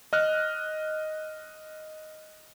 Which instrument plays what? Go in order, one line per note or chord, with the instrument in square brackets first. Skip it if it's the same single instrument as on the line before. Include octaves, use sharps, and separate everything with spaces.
[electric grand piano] D#5 F6 F#6